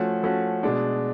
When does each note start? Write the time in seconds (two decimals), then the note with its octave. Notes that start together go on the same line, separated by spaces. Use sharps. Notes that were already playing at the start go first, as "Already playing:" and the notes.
Already playing: F3 A3 C#4 F#4
0.23 F3 A3 C#4 F#4
0.63 B2 G#3 D4